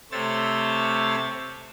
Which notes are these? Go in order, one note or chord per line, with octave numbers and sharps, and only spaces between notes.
C3 A3 C5 C#5 E6 A6